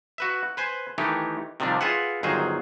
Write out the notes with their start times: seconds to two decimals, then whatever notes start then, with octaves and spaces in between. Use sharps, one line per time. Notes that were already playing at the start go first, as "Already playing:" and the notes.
0.18 F#4 B4 E5
0.57 B4 C5 G#5
0.98 D#3 E3 A3 D#4 G4
1.60 C3 D#3 F3 G3 D4
1.81 F4 G#4 B4 E5 F#5
2.23 G1 D#3 F#3 G#4 C5